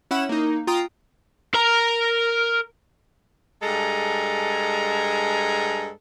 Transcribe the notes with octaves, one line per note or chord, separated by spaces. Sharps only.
C#4 E4 F#5 B5 E7
A#3 D#4
F4 G5 A#5 D#6
A#4 A#5
G2 G#3 A4 G#5 A#5